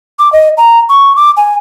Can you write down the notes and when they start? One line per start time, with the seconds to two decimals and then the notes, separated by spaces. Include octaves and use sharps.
0.19 D6
0.33 D#5
0.58 A#5
0.89 C#6
1.16 D6
1.37 G#5